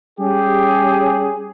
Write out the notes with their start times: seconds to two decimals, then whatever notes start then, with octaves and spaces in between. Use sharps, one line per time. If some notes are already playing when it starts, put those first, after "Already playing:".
0.20 G3 C#4 G4 G#4